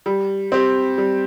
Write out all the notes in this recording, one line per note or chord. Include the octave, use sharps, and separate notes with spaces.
G3
C4 G4
G3